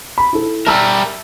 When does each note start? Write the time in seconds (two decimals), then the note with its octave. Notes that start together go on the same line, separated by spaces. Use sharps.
0.18 B5
0.33 E4 A4
0.66 G3 A#4 E5 A5 E6